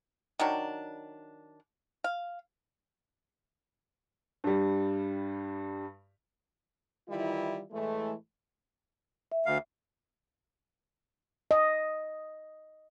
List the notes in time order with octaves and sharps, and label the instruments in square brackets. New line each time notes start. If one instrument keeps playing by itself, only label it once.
[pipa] D#3 F#3 D4
F5
[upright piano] G2 G3
[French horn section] D#3 E3 G3 E4 F4
A2 E3 G#3 A3
[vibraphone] E5
[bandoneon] D2 F5
[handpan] D#5